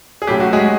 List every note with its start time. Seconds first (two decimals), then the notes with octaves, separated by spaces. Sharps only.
0.22 G#4
0.27 A2 F#3 A3 C#4 G4
0.40 F#4
0.53 G#3 G#4